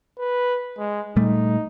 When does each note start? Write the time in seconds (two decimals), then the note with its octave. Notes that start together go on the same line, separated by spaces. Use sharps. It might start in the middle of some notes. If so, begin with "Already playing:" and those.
0.19 B4
0.79 G#3
1.16 A#2 G3 A3 D#4